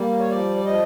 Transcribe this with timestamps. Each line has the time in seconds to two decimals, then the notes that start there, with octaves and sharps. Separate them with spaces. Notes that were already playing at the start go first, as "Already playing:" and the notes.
Already playing: G3 A#3
0.19 C#5
0.28 F3 D5
0.57 D5
0.65 F3 D#5